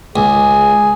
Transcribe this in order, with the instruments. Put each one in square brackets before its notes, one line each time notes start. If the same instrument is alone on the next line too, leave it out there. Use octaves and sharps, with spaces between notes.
[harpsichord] C#2 [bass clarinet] G#4